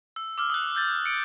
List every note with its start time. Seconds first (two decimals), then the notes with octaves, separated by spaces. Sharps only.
0.16 E6
0.38 D6 E6 F6
0.50 D#6 E6 F#6
0.75 E6 G6 A6
1.06 C#7 D7